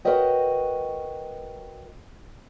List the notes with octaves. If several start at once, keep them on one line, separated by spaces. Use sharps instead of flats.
F#4 A#4 B4 C#5 D#5 G5